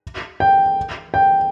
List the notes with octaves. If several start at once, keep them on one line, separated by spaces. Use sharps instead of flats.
G5
G5